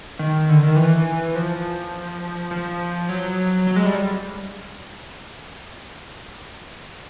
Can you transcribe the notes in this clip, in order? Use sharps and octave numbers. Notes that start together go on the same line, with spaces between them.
D#3
D3
D#3
E3
F3
F3
F#3
F#3
G#3
G3